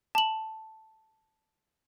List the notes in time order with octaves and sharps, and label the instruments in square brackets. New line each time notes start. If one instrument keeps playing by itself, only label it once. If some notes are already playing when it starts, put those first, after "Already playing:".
[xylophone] A5 F#7